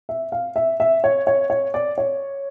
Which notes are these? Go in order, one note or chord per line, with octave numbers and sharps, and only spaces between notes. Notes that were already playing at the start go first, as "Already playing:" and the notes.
E5
F5
E5
E5
C#5
C#5
C#5
D5
C#5